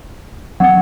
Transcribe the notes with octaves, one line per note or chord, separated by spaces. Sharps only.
F#3 C4 F#5